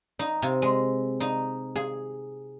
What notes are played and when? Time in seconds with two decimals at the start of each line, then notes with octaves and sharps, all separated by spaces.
0.19 D#4
0.42 C3
0.62 G#3
1.20 D#4
1.76 G#4